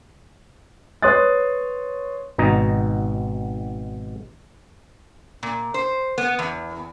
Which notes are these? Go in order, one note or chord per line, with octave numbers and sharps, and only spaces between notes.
B4 C#5 C6 D#6 F#6 A6
G#1 B2 D#4 A#5
A#2
C5
B3
E2